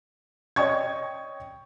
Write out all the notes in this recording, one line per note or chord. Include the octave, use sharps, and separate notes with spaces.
C#5 D#5 G5 C#6 G#6